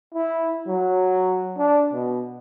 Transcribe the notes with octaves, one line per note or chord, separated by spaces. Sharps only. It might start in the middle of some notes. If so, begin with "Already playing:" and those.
E4
F#3
D4
B2